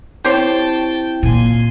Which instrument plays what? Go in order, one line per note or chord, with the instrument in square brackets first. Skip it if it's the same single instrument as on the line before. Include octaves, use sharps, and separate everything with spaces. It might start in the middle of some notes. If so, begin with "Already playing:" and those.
[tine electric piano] C4 E4 [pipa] G4 C5 C#5 [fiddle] G5 A5
[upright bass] A#2 [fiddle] G#5 C6